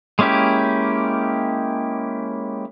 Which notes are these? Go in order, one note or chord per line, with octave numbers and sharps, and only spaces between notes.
G#3 A#3 C#4 E4 G4